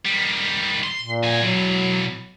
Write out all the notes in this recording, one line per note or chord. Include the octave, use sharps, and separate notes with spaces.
D#3 G3
C6
A#2
F#4 G#5
B2 E3 F#3